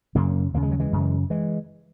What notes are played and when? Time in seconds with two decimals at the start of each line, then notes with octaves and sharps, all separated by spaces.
0.15 F#2 C#3 F#3 A#3
0.54 D#2 C#3 A#3
0.63 G#3
0.71 F#3
0.80 E3 G#3
0.93 F#2 C#3
1.30 E3 G#3